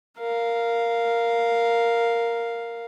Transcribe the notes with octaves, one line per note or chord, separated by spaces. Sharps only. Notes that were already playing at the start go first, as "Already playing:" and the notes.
A#4 F5